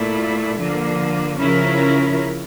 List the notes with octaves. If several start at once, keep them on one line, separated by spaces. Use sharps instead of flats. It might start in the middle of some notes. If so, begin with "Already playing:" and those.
Already playing: A#2 A3 E4
D3 F3 A#3
C#3 F3 C#4 E4 A#4